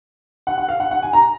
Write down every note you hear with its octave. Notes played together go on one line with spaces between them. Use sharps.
F#5
F#5
F5
F#5
F#5
G#5
A#5